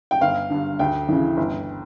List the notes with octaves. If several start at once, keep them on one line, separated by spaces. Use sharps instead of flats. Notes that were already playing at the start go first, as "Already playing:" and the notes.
G5
G1 F5
G2 D3
D2 G5
C#3 E3
G1